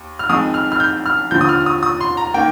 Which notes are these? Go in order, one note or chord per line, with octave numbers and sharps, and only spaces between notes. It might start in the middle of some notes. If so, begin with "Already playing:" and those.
Already playing: D#2
F6
F2 D#3 G#3 D#6
F6
F6
G6
F6
D#2 D3 F3 G6
D#6
F6
D#6
D#6
C6
A#5
D#3 A#3 G5